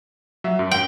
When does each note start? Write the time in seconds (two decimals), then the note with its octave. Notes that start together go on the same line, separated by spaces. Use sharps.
0.44 F#3 E5
0.59 F#2
0.71 G5